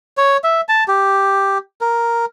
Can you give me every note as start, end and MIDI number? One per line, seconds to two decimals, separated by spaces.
0.18 0.37 73
0.44 0.61 76
0.69 0.84 81
0.88 1.58 67
1.81 2.25 70